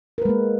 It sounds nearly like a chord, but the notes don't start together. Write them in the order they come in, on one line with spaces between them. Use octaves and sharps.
A#4 B4 G#3 A#3